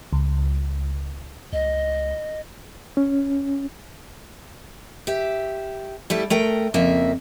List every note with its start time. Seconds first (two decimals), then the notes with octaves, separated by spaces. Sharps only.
0.13 C#2
1.53 C#2 D#5
2.97 C#4
5.07 G4 E5
6.10 G3 A3 E4 G4
6.30 A3 A#4 G5
6.74 F2 C#3 A#3 E5